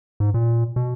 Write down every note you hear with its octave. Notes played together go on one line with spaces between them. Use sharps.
G#2
A#2
B2